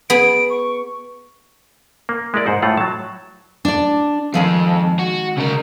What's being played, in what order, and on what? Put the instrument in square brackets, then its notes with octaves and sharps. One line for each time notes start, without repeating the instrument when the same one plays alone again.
[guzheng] B3 G#4 [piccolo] D7
[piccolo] C#6
[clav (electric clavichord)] A#3
G#3 E4 A#4 D5
G#2 C5 F#5
A2 A3 F4 C#5 F#5
F#3 A5
[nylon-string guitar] D4 D5
[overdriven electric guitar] F2 [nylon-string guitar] D#3 G#3 F5
[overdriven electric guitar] F#4
C#3 A#4